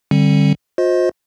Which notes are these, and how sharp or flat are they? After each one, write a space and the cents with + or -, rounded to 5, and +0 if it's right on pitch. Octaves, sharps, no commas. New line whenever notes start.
D3 +5 G3 -15 C4 +35
F4 +45 C5 +0 D#5 +20